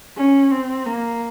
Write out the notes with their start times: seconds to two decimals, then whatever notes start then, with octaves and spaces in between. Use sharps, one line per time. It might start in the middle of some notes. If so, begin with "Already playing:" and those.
0.17 C#4
0.52 C4
0.86 A#3